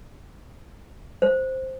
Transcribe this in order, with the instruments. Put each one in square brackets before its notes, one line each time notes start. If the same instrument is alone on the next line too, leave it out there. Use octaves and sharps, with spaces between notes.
[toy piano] C5